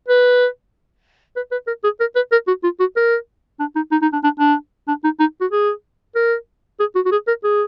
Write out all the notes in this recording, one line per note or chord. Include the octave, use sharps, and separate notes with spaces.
B4
B4
B4
A#4
G#4
A#4
B4
A#4
F#4
F4
F#4
A#4
D4
D#4
D#4
D#4
D4
D4
D4
D4
D#4
D#4
F#4
G#4
A#4
G#4
F#4
F#4
G#4
A#4
G#4